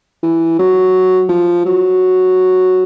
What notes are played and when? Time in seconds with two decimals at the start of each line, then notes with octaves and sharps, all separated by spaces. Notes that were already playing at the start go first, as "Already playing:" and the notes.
0.23 E3
0.59 F#3
1.29 F3
1.65 F#3